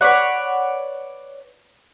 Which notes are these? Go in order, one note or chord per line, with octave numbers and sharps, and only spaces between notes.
B4 C#5 D5 F#5